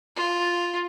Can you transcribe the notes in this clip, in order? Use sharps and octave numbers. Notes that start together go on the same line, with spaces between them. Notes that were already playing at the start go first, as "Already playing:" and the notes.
F4